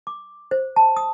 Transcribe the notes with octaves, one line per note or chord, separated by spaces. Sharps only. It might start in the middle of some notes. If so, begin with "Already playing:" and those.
D6
C5
A5
D#6